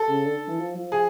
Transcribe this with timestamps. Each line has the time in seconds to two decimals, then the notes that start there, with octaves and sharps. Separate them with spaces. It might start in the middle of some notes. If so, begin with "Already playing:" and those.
Already playing: A4
0.09 C#3
0.26 D3
0.48 E3
0.59 F3
0.76 F3
0.92 G#4